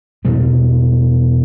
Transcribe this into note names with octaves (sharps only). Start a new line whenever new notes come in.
E2 B2 G3 C4